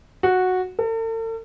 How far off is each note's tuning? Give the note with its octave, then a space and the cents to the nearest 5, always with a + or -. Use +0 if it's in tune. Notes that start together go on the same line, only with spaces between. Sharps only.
F#4 -5
A4 +45